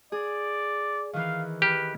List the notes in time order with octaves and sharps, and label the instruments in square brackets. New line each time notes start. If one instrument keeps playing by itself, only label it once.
[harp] G#4 [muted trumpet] D5
[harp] D#3 E3 [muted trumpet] F5
[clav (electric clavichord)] G4 [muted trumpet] B4 [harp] F6